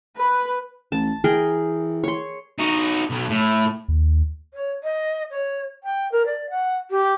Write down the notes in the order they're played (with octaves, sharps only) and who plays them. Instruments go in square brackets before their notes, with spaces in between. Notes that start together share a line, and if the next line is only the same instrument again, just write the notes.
[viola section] B4
[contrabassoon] A1 [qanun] A5
[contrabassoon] E3 [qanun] G#4 A#4 G5
[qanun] C#5 C6
[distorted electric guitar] D#4 F#4
B1
A2
[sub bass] D#2
[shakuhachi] C#5
D#5
C#5
G5
A#4
D5
F#5
G4